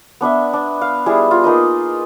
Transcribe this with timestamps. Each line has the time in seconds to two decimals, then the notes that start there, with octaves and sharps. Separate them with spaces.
0.21 B3 D4 B4 E5
0.53 D4
0.82 F5
1.06 G3 E4 G#4
1.31 F4
1.44 A#3 D#4 B4 D#5